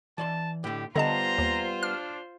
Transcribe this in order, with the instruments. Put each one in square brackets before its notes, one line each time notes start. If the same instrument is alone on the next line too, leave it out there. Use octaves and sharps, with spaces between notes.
[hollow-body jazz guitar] E3 D5 C6 [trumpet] A5
[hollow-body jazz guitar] A2 D3 [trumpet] G4
[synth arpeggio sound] D3 D#5 A5 [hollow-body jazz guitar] G3 B3 [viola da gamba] F4 C5 [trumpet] A#5
[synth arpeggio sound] D#2
[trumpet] D4 [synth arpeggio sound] F6